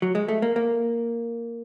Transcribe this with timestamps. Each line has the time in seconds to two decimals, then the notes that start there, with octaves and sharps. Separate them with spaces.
0.02 F#3
0.15 G#3
0.28 A3
0.42 A#3
0.56 A#3